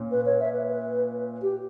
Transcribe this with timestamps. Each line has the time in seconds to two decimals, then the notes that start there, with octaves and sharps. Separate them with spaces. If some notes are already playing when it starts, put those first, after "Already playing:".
Already playing: A#2 C#4
0.11 B4
0.26 C#5
0.40 E5
0.53 B4
0.68 B4
1.42 G4